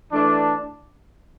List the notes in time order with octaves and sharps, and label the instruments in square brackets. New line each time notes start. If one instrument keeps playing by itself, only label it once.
[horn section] E3 A3 D4